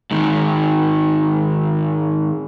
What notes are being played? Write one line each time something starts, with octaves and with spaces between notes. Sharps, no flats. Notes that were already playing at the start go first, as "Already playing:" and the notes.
G#2 D#3